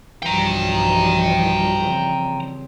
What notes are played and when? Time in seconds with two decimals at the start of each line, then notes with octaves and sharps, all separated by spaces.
0.22 B1 G2 E3 F3 G3 G5 A#5
1.79 C#3 C4